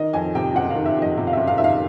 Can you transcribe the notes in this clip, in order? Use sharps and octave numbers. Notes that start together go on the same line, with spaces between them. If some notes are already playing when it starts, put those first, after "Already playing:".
Already playing: D#3 D#5
F2 G#5
C3 G5
F#1 F#5
F5
D#3
E5
F2 D#5
C3
F5
F#1 E5
F5
D#3 E5
F5